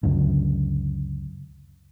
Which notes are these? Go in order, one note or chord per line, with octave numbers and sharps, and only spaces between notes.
C#2 F#2 D3